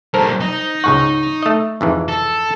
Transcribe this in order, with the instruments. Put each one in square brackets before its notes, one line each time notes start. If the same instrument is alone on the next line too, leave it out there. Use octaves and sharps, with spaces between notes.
[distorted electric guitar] G2 A#2 [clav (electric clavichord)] A4 A#4 [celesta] C5
[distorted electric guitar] D#4
[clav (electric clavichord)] C#2 G#2 F#5 [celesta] C#6
[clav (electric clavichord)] A3 D#5
F2 G#2 E3
[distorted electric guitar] A4